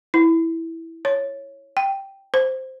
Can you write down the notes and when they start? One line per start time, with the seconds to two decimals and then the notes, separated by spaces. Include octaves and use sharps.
0.14 E4
1.05 C#5
1.77 G5
2.34 C5